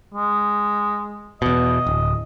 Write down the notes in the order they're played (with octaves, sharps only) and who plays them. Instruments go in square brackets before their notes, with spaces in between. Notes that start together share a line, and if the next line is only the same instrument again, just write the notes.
[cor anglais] G#3
[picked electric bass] E2 B2 [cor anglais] D#5
[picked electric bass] D1